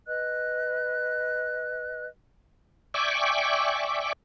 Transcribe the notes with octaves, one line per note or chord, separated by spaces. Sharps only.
B4 D#5 F#6
D5 E5 G5 G#5 C#6 D6